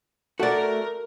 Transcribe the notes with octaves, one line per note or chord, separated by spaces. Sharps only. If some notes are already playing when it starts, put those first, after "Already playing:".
A3 F#4 A#4 D5